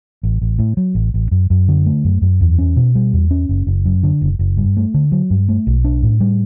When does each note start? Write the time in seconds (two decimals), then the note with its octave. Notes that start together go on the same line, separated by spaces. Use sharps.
0.23 A1
0.42 A1
0.59 A2
0.77 F#3
0.95 A1
1.14 A1
1.31 F#2
1.50 F#2
1.68 D3
1.86 A3
2.04 F#2
2.22 F#2
2.41 E2
2.59 C#4
2.77 B2
2.95 G3
3.13 E2
3.31 C#4
3.49 F#1
3.67 F#1
3.85 F#2
4.03 D3
4.22 F#1
4.39 F#1
4.57 G2
4.77 A3
4.94 D3
5.12 F#3
5.30 G2
5.49 A3
5.67 B1
5.84 D4
6.03 A2
6.21 G3